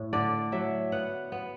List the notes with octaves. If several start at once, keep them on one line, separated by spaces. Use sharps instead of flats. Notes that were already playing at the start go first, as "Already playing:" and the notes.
Already playing: A2
D3 D5
F#3 E5
B3 F#5
B3